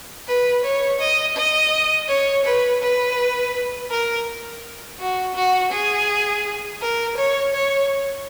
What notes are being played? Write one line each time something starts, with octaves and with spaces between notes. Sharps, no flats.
B4
C#5
D#5
D#5
C#5
B4
B4
A#4
F#4
F#4
G#4
A#4
C#5
C#5